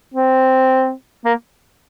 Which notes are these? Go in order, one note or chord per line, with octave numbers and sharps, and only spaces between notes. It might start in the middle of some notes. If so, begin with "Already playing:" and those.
C4
A#3